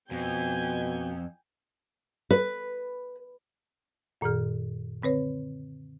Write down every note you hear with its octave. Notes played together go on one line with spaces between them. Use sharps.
F2 B2 G5 G#5 G#6
B4
F#2 A#2 D#3 G#4 F6
D3 C4 B4 C#5